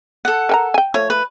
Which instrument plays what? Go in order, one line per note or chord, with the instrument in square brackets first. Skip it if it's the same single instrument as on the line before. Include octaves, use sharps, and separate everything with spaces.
[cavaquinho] A4 F#5
[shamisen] A#4 G5 A#5
G5 G#5
[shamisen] F3 A3 [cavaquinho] C#5
[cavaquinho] B4